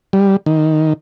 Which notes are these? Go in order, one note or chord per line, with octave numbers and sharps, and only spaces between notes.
G3
D#3